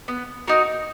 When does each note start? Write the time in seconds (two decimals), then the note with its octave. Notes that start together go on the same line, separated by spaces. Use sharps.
0.08 B3
0.47 D#4 F#4 A#4